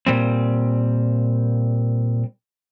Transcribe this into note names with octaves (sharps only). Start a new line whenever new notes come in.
A#2 G3 C4